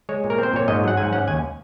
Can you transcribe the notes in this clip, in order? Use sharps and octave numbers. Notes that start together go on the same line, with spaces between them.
G#3 C#5
A#2
A#4
C4 C5
A#2 C#5
G#2 D#5
F#3 F#5
G#2 G#5
C#4 F#5
D#2 G#5